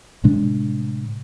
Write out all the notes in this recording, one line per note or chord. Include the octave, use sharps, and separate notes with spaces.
A2 C3 G#3 D4